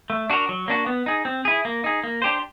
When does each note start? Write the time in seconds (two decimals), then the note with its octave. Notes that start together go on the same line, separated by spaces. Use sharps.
0.10 A3
0.30 D4 F#4 A#4
0.49 F#3
0.68 A#3 D4 F#4
0.86 B3
1.06 D#4 G#4
1.25 C4
1.45 E4 G#4
1.65 A#3
1.84 D#4 G#4
2.04 A#3
2.22 D4 G4 C5